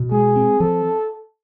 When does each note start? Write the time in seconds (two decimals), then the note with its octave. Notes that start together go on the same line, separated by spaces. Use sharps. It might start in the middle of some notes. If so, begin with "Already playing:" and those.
Already playing: B2
0.12 G#3 G#4
0.36 C4
0.60 F3 A4